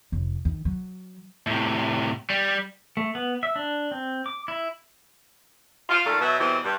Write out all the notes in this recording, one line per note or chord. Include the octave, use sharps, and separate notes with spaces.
F1
D#3
F#3
A2 C3
G3
A3
B3
E5
D4
C4
D6
E4
F4
A#2 D#3 A3 A4 F5
B2 F#3 E5
B2 E3 F#3 G3 A3 C4
G2